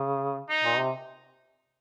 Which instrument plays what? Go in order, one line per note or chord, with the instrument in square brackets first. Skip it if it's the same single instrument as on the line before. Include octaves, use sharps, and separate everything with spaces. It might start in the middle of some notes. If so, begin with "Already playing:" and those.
Already playing: [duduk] C#3
[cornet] D#4
[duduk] A#2
C3